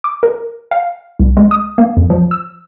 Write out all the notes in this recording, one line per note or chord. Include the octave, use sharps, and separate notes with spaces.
D6
A#4
F5
C2
G#3
D#6
A#3
F2
F3
E6